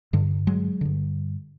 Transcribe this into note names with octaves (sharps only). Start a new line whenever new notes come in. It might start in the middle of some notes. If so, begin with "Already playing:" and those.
G2 D3
F#3 G#3
G2 D3